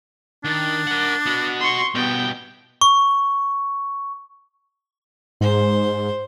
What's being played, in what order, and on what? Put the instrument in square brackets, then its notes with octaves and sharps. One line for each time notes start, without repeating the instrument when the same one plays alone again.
[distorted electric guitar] D#3 [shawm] D4
[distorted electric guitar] A#4 F#5
B3 F#4
[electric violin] C6 C#6
[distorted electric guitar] B2 G3 [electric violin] B3 G5
[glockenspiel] C#6
[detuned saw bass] G#2 [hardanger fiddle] C5